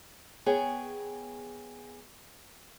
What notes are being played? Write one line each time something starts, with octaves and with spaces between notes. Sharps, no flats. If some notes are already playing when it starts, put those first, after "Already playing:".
B3 G#4 C#5 G5